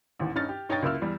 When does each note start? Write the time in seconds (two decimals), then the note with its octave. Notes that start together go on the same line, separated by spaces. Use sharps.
0.20 A1 D#2 G#2
0.35 G2 C#4 D#4 F6 A6
0.49 G4
0.69 G2 D#4 C#5 D#5 G5 A6
0.82 C#2 F#2 A#3 E4 E6 F6
1.01 E2 G3